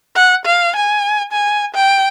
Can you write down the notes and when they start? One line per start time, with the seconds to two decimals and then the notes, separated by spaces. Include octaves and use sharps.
0.15 F#5
0.45 F5
0.76 G#5
1.32 G#5
1.74 G5